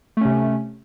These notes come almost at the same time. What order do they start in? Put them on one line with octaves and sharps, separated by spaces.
A3 C#4 C3